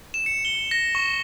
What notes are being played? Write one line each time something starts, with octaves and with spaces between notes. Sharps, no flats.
E7
C#7
G7
A#6
C#6